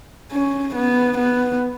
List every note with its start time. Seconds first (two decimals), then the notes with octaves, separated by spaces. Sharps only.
0.32 C#4
0.75 B3
1.18 B3